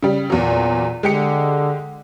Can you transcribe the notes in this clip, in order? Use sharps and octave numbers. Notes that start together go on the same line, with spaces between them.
C#3 G3
E2 A#2 F#3
D3 G#3 G4 C#7